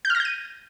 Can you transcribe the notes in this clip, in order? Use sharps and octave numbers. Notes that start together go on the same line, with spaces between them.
G6
F6
A#6
G6
D#7